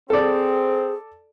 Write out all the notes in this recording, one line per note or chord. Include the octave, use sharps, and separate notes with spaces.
C4 G#4 A4 D5